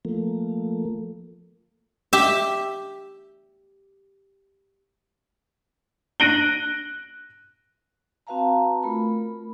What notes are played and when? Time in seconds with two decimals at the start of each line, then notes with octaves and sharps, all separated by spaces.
0.05 F3 A3 A#3
2.13 G4 E5
6.20 F#6 A#6 D7 D#7 F#7 G7
8.27 C4 F#4 B4 F5 A5 A#5
8.83 A3 F4 A#4 B5